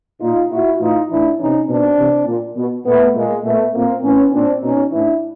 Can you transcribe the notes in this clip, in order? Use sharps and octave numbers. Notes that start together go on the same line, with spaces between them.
A#2 D#4 F4
A#2 E4 F#4
A2 E3 D#4 F4
A2 E3 D4 E4
C3 E3 C#4 D#4
B2 C4 D4
C3 E3
A#2
B2
A#2 A3 B3
A#2 G#3 A#3
A#2 A3 B3
A#2 A#3 C4
A2 E3 B3 C#4
A#2 C4 D4
B2 C#4 D#4
A2 E3 D4 E4